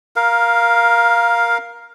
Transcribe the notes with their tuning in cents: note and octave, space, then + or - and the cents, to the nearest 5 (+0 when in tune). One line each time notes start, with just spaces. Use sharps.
A#4 +15 F5 +0